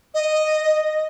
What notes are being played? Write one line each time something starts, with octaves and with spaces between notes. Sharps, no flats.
D#5